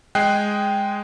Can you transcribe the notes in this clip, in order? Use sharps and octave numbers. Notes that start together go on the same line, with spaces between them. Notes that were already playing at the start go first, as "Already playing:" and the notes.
G#3 G#4 G5 F#6 C7